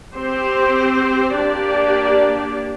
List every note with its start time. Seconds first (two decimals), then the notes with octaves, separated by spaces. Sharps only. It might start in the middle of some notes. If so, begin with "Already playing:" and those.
0.16 C4 G4 C5
1.36 A#3 D4 G4 D5